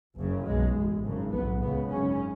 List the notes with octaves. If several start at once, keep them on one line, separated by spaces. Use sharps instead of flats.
F#1 F#2 C#3
B1 B2 G#3
A1 A2
G#1 F#2 C#3
B1 A2 B3
C#2 C#3 B3
G#1 F#2 C#3 C#4